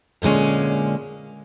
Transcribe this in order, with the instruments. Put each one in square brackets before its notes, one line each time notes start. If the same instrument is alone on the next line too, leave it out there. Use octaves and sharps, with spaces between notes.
[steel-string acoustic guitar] F2 A#2 D3 G#3 C#4